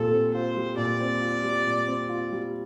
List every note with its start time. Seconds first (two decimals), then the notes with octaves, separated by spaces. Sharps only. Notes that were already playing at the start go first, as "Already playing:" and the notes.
Already playing: A#2 G3 C4 F4 A4
0.11 C4
0.34 F4 C5
0.57 G3
0.77 A#2 D5
1.00 C4
1.21 F4
1.43 G3
1.66 A#2
1.87 C4
2.09 F4
2.32 G3